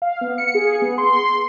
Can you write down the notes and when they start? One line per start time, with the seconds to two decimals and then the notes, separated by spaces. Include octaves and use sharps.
0.02 F5
0.21 B3
0.38 C#7
0.55 G#4
0.82 B3
0.98 C6